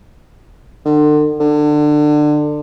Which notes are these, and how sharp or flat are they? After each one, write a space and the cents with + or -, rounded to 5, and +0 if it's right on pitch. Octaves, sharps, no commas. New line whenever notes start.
D3 +40
D3 +25